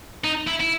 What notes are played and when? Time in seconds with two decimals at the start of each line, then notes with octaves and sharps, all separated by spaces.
0.24 D#4
0.47 E4
0.60 E4